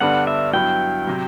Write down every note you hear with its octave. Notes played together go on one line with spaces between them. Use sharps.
G2 D3 G3 B3 D4 F#5
E5
G2 F#3 B3 E4 G5
C3 F#3